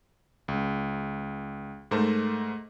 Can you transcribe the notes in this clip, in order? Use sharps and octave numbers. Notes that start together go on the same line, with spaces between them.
C#2
G#2 A3 A#4 C5 A5